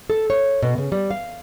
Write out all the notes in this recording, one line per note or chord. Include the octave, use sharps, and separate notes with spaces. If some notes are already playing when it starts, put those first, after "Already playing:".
A4
C#5
B2
C#3
G3
F5